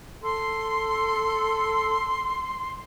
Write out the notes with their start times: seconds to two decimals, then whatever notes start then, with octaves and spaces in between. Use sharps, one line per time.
0.23 A4 C6